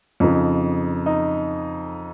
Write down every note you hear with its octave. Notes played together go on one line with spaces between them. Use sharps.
F2 C#3 F3 D#4
D#4